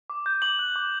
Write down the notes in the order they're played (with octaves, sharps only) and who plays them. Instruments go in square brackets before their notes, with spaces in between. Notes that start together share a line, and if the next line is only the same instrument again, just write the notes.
[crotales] D6
G6
D6 F#7
F#6
D6